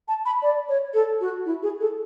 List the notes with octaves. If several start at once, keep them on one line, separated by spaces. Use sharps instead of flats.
A5
B5
D5
C#5
A4
F#4
E4
G#4
A4